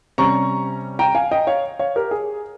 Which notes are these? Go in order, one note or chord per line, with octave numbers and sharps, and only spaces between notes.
C3 G3 C#4 A#5 C#6
G5 A#5
F5 G#5
D#5 G5
C#5 F5
C#5 F5
G4 A#4
G#4